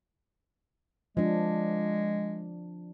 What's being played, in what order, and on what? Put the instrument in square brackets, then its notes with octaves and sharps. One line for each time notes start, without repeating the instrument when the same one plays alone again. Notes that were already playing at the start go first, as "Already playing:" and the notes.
[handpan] F3 D4 [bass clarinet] G#3